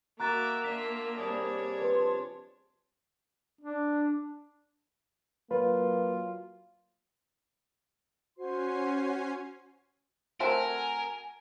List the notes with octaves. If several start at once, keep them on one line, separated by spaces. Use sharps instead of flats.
A#3 F#4 E5 A#5 D6 F#6 A6
D4 F4 E5 B6
C3 G3 D4 G#4 C#5
F3 B4 C6
D4
F#3 A#3 F4 B4
C#4 F#4 C5 G#5 C6 C7
A3 C4 F#4 A#4 G#5